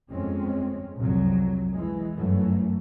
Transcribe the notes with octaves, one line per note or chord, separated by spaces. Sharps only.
G1 F2 G#3 C4 C#4
C2 F2 F#3
E3 G#3
G1 F#2 E3 F#3 A3